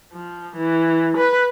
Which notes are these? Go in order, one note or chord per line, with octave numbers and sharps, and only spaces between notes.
F3
E3
B4